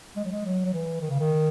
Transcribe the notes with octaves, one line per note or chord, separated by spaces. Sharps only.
G#3
F#3
G#3
F#3
F#3
E3
D#3
C#3
D#3